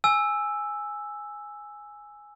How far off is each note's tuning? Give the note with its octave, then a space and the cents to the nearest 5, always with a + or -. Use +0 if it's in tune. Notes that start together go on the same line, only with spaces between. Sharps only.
G#5 +0 E6 +0